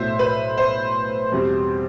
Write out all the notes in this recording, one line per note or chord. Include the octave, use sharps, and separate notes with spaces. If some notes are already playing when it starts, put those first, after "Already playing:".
Already playing: B1 A2 F#3 C5 E5
B4
C5
E2 B2 G3 C4